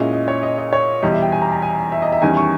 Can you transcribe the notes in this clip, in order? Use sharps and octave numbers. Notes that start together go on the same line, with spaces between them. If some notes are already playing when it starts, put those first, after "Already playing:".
Already playing: A#2 G#3 C#4 E4 D#5
D#5
C#5
D#5
D#5
C#5
E2 B2 G3 D#5
E5
G5
G#5
A#5
A#5
G#5
E5
D#5
E5
E2 D#3 G3 C#4 E4 G#5
C#6